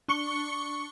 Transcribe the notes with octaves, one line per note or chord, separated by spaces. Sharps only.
D4 C#6 C#7 G7